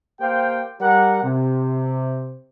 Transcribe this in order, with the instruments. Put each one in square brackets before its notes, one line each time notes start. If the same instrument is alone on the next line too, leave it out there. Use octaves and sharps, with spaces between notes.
[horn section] A#3 G4 C5 F5 G5
G3 G4 A#4 F#5
C3